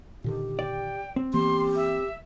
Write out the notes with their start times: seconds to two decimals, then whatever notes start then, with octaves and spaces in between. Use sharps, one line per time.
0.24 A#2 D3 D#3 G4
0.59 D5 G5
1.16 C4
1.34 E3 A#3 B3 G4 C6
1.76 E5